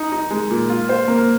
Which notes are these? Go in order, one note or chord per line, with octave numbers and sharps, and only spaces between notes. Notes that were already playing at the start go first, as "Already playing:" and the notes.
Already playing: D#4
D#4
G#3
A#2
F4
C5
A#3